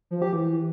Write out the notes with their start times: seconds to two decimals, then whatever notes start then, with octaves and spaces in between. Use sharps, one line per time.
0.11 F3
0.22 G4
0.33 E3